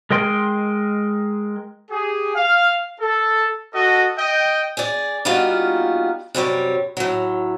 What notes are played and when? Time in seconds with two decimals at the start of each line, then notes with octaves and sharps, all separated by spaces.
0.11 G#3 A#4 D#5 G5 C6
1.91 G4 G#4
2.35 F5
3.00 A4
3.73 F#4 A4 D#5
4.18 D#5 G5
4.77 G#4 D5
5.25 G3 A#3 B3 D#4 F4 F#4
6.34 F#2 C3 G3 C#5
6.97 A2 F#3